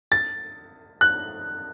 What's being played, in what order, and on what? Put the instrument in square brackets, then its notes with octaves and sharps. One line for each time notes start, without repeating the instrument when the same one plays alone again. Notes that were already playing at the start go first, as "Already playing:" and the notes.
[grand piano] A6
F#6